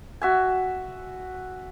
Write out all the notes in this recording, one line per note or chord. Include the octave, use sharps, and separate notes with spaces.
F#4 E5 G#5